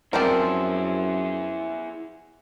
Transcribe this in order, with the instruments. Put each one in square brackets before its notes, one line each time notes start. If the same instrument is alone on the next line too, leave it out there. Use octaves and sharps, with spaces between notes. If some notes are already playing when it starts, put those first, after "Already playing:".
[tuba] F#2 [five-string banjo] F3 C4 [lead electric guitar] E4 G#4 [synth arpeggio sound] A#4 C5 D5